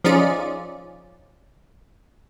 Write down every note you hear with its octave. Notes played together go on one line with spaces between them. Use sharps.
F3 C#4 D#4 F4 G#4 D5